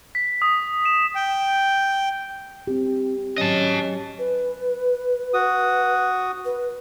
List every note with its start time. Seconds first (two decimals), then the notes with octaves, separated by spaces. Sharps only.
0.15 B6
0.42 D#6
0.85 E7
1.15 G5
2.67 C4 G4
3.38 F#3 C#4 D#5 A5
4.19 B4
5.34 F#4 D#6
6.45 B4